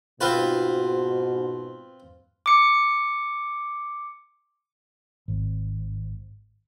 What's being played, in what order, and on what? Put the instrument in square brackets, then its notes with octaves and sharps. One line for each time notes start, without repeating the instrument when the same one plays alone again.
[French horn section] G#2 B2 [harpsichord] C4 F4 B4
[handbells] D6 C#7
[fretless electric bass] G#1